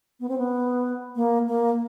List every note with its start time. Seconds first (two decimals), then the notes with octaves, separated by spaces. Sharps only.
0.20 B3
0.29 C4
0.38 B3
1.16 A#3
1.48 A#3